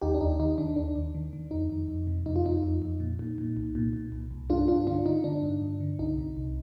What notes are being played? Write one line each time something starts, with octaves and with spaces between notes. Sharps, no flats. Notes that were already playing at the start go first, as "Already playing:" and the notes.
D#2 D#4 G4
D4
D#2 D#4
D#3 D#4
D#3 D4
D#2 D4
D#2
D#3
D#3
F2 D#4
F2
F2
C3
F2 D#4
F4
F2 D#4
F2
F2
A#2
A#2
A#2
C2
A#2
A#2
C2
C2
G2 D4 F4
G2 D4 F4
D3 D4 F4
D3 D#4
D3 D4
G2
G2
D3
C2 D#4
C3
C2